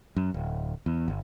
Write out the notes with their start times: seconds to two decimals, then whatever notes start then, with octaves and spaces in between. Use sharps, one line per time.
0.16 F#2
0.34 D1
0.86 E2
1.08 G1